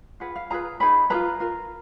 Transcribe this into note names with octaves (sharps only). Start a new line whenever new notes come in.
F4 G#4 B4 F#5
F5
F4 G#4 B4 A#5
D#4 G#4 B4 B5
F4 G#4 B4 A#5
F4 A#4